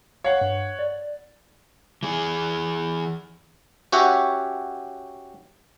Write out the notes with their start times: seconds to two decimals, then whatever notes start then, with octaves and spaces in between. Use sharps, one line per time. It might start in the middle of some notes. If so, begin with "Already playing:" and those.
0.24 C#5 F5 F#5
0.41 G2
0.79 D5
2.03 E3 G#4
3.92 C#4 F#4 G4 C#5 E5 F#5